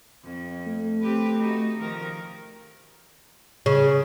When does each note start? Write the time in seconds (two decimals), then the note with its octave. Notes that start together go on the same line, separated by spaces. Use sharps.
0.23 F2
0.67 A3
1.02 C4 G4 B4
1.37 D#4 F#4
1.79 D#3 F3 A#4
3.66 C#3